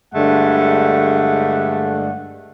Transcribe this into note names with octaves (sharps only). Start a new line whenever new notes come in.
G2 D3 G#3 A3 F#5